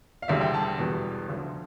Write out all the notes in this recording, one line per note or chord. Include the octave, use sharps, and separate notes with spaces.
F5
E1 D2 D3 G3 E5
G5
A5
G5
E1 E2 B2 G3
D2 D3 F3